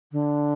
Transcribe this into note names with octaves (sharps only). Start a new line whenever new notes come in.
D3